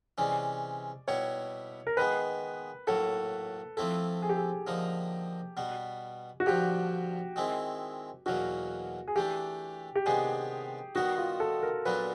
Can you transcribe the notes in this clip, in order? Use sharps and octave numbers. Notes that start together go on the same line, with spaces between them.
C3 E3 G#3 C#4 D5
B2 G3 B3 E4 G4 C#5
A#4
D#3 G#3 B3 B4
A2 F#3 A#3 A4
F3 A3 C4 E4 A4
G#4
G4
G#4
D3 F3 A#3 D#4
B2 G3 B3
F#4
G2 D3 F3 G4
D#3 G#3 C4 E4
E2 B2 F#3 A#3 F#4
G#4
E3 A3 D4 G4
G4
C3 D#3 G#3 B3 D4 G#4
D#3 G3 B3 D#4 F#4
F4
A4
A#4
A#2 F#3 B3 D4 B4